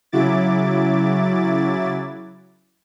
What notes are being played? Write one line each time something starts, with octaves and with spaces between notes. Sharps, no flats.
C#3 F#3 E4 D6 A6